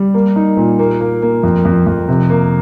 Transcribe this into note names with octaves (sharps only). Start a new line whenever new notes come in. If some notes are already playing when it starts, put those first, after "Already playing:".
Already playing: G3
A#3
D#4
A#2
A#3
A#3
A#3
F2
F2
F2
C3
A#3